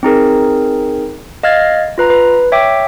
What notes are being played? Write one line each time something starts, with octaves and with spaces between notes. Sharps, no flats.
C4 D#4 G#4 A#4
D#5 F5 F6 G#6 A6
F4 B4 A#5
B4
C#5 E5 G5 D6